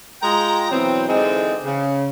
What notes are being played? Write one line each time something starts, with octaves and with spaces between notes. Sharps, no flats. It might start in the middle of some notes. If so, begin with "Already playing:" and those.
G#3 F4 G5 A#5
B2 E3 F#3 C4
D3 E3 G#3 C4 D#4
C#3